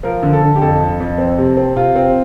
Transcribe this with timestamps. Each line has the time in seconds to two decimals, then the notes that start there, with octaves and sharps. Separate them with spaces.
0.03 F3 A#4
0.23 D3
0.33 A4
0.42 D3
0.56 G4
0.61 F2 A4
0.80 F2
1.00 F2
1.18 C4
1.38 C3
1.57 C4
1.76 C3 F4
1.96 C4